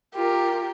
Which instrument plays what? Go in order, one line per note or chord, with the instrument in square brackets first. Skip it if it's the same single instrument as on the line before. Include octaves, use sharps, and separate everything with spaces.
[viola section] F4 A#4 [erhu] G4